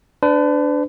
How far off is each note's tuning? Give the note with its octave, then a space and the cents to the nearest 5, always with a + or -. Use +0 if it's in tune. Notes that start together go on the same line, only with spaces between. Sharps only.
D4 -5 B4 +40